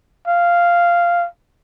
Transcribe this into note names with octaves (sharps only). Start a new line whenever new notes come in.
F5